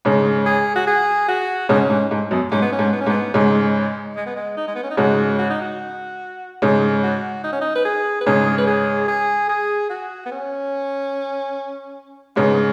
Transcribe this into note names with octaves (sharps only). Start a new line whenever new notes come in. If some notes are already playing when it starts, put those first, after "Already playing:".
G#2 C#3
G#4
F#4
G#4
F#4
G#2 C#3 C#4
G#2
G#2
F#2 B2
G#2 C#4
B3
C#4
G#2
B3
C#4
G#2 B3
G#2 C#3 G#3
G#3
B3
G#3
D#4
G#3
B3
C#4
D#4
G#2 C#3 F#4
F#4
D#4
F#4
G#2 C#3
F#4
D#4
C#4
D#4
B4
G#4
B4
G#2 C#3 G#4
B4
G#4
G#4
G#4
F#4
B3
C#4
G#2 C#3 B3